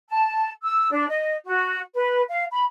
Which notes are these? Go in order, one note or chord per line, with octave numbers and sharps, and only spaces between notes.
A5
E6
D4
D#5
F#4
B4
F5
B5